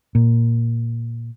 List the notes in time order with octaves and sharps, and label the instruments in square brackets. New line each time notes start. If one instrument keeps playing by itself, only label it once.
[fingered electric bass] A#2